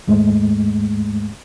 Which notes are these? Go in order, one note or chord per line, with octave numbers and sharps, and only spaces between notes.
D#2 G#2 G#3 A3